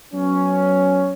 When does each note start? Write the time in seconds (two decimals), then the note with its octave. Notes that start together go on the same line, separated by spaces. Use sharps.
0.13 F#3 B3 C#4